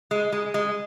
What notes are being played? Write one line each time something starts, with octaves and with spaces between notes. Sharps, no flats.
G#3
G#3
G#3